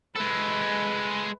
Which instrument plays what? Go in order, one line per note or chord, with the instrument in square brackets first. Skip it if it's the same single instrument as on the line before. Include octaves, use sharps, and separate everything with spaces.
[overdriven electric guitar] G#3 A4 [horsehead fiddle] B4